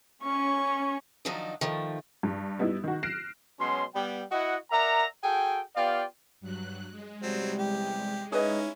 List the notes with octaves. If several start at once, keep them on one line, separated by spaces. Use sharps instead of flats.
C#4 C#6
D#3 F3 F#3 D4 D#4 D#5
D#3 F3 A3
G2
G3 B3 D#4 E4
D#3 F#4
F6 F#6 A#6 C7 D7 E7
B2 F#3 G#3 C#4 C6
G3 B3 G5
E4 F#4 D#5 F#5
A#4 D5 E5 F#5 A#5
F#4 G#4 A4 G5
B3 F4 G4 D5 F5 G5
G2 F#3 F#6
G#3
E2 C3 F#3 G3 C4
G4
C#4 D#4 E4 G#4 B4 D#5